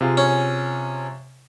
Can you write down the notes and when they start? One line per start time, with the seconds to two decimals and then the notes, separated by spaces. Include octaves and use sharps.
0.01 C3 F4 G#4
0.17 C#4